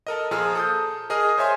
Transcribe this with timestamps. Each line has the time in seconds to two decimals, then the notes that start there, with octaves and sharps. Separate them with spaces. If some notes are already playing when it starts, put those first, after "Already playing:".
0.07 A4 A#4 D#5
0.31 A#2 F3 G#4 A#5 E6 F6
0.55 A4 D#6 G6
1.10 G#4 A#4 D#5 D#6 F6
1.38 C5 C#5 E5 G#5 C6